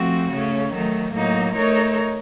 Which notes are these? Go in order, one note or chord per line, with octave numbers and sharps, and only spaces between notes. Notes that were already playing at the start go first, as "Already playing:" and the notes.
Already playing: F3 A3 C4 F#4
C#3 A3 C#4
D#3 F#3 A3
A2 F#3 A#3 D#4
A3 D#4 A#4 C#5